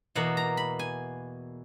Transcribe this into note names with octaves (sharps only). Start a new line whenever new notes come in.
E2 B2 A#3 F#5
A#5
B5
G#5